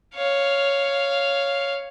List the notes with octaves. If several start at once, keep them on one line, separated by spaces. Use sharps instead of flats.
C#5 F5